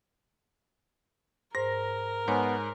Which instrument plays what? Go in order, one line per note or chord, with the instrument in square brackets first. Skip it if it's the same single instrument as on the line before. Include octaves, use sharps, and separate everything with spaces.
[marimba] G#2 C5 [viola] A#4 [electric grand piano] A#6
[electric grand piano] G#2 [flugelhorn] B3 [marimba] C#5 G#5